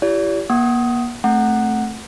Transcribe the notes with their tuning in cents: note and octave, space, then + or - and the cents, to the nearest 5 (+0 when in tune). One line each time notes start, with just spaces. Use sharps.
E4 +35 G4 +0 D5 -45
A#3 +35 F#5 +30 D#6 +10
A3 +0 C4 +15 F#5 +0